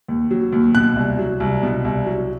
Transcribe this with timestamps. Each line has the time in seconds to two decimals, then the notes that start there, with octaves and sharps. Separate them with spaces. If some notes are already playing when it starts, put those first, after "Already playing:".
0.08 D#2
0.31 F#3
0.52 D#2
0.75 B2 F#6
0.96 C2
1.19 F#3
1.40 C2
1.63 B2
1.85 C2
2.06 F#3